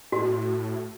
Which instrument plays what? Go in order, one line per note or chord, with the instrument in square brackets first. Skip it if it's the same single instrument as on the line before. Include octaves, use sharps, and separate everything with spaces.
[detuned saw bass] A2 [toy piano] F#4